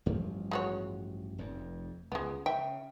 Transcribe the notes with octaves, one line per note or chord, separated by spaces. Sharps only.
A1 G2 F3
G#3 F#4 C#5
F1 F2
C#2 G#3 B3
C#3 E5 G5